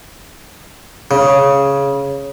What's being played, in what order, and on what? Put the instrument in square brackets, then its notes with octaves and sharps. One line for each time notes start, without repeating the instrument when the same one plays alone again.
[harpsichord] C#3